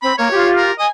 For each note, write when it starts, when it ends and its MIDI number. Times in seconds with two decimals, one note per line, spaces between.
0.02 0.12 60
0.02 0.14 83
0.18 0.28 58
0.18 0.50 73
0.30 0.69 65
0.30 0.71 67
0.57 0.73 70
0.79 0.86 75
0.79 0.87 80